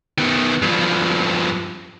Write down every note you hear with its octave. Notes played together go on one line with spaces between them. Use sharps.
D#3 B3
G2 F3